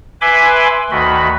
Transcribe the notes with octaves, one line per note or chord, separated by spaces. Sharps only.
B4 E5 G#5 B5 C6 D6
D2 D#3 F#4 B5